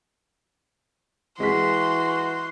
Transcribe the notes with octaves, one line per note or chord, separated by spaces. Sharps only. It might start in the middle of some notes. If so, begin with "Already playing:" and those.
E3 G#3 F#4 C6 B6